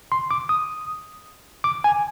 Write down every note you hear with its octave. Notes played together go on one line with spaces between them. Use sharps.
C6
D6
D#6
D6
G#5